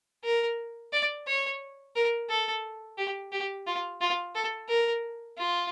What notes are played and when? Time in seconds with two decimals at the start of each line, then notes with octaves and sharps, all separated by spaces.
0.24 A#4
0.93 D5
1.27 C#5
1.96 A#4
2.30 A4
2.98 G4
3.32 G4
3.67 F4
4.01 F4
4.35 A4
4.69 A#4
5.38 F4